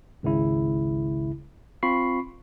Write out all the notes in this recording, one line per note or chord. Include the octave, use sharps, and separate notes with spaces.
G#1 C#2 C#3 E4
C4 F4 B5 C#6 C7